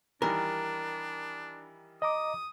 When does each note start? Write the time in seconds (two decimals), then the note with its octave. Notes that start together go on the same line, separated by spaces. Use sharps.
0.22 D#3 E3 G3 D4 A#4
2.02 D#5 A#5 D6 D#6